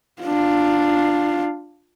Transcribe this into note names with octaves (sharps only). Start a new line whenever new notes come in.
D4 F4